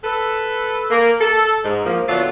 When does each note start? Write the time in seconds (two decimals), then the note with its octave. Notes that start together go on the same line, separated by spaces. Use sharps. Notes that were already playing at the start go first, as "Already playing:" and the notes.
0.04 A4 B4
0.90 A#3
1.21 A4
1.64 G#2
1.85 F3 A#3
2.07 A2 D3 F#3 A3 B3 F4